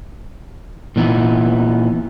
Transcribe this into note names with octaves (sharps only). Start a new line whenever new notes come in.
A#2 E3 B3 D#4